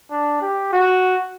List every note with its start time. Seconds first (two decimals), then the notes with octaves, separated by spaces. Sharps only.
0.11 D4
0.41 G4
0.73 F#4